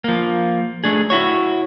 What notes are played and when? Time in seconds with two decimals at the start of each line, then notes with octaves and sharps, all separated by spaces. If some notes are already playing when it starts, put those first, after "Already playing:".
0.04 F3 A#3
0.84 A3 D4 G#4
1.10 E4 F#4 C#5